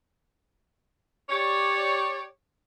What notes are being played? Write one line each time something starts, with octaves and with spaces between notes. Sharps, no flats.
G4 C#5 D5